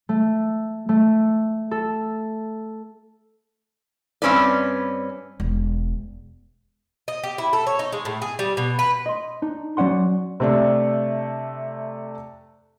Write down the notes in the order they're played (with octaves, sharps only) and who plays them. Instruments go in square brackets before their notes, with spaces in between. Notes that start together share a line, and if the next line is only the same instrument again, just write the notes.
[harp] A3
A3
A4
[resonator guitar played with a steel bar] G2 C4 C#4 B4 D5
[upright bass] E1
[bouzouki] D#5
G4
E4
A4
C#5
D#4
G#3
A2
G#4
G3
B2
B4
[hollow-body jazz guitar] D#5 C6
D4 D#4
F#3 C#4 D5 F#5 C6
[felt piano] C3 A3 D4